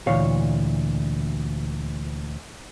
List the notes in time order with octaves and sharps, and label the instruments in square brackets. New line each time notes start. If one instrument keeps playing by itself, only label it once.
[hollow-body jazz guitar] D2 A#2 E3 C#5 F5